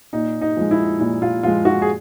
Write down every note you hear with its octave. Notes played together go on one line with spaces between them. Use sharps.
A#2 D#4
D#4
F3 G#3
E4
A#2 E4
F4
F3 G#3 F4
F#4
G#4